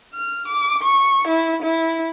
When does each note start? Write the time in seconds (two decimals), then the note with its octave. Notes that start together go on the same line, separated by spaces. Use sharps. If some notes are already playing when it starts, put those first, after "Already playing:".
0.14 F6
0.48 D6
0.83 C#6
1.28 E4
1.62 E4